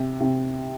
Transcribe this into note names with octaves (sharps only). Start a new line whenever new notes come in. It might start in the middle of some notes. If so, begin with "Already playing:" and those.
Already playing: C3
C3